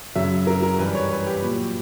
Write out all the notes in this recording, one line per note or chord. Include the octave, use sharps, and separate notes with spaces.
F#2 C#3 F#3 E5
A#4
A#4
G2 E3 B4
C#5
B4
G4
A#2 F#3